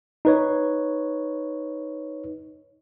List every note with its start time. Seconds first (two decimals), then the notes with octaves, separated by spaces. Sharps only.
0.25 D#4 B4 C#5